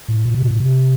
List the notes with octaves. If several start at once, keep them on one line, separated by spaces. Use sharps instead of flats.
A2
A#2
C3
A#2
A2
C3